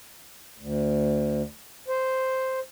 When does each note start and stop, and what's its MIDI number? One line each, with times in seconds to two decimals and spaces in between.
0.60 1.42 38
1.88 2.59 72